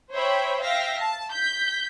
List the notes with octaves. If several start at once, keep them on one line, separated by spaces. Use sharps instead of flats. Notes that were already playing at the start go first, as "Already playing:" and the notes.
C5 C#5 E5 G5 B5
E5 F5 G5 A#6
A5
G6 B6